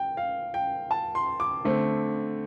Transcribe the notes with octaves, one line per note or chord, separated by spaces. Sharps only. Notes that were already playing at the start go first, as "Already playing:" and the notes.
Already playing: G5
F5
G5
A5
C6
D6
D3 A3 C4